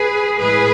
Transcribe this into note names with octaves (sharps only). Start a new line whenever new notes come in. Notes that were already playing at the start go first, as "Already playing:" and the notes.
Already playing: G#4 B4
A2 E3 G#3 G#4 B4